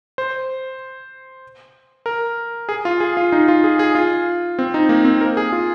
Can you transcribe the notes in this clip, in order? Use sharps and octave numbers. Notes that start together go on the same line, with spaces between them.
C5
A#4
G#4
F4
G#4
F4
D#4
F4
G#4
G#4
F4
C4
D#4
A#3
C4
A#4
G#4
F4